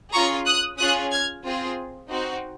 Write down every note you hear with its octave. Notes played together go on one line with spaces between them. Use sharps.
C#4 F4 G#4 A#5 C#6
D#6 F#6
C#4 F4 G#4 D#6 F#6
F6 G#6
C4 F4 G#4
C4 D#4 F#4